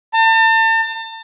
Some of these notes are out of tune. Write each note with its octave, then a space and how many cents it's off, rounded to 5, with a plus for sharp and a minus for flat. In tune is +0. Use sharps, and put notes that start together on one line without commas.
A5 +40